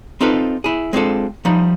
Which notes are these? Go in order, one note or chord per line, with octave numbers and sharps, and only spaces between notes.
C4 D#4 F4 A4 B4
E4 G#4
G#3 C4 D4 F4 A4
F3 G3 D#4 B5